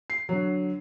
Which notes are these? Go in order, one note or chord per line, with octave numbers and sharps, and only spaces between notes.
C7
D3 F#3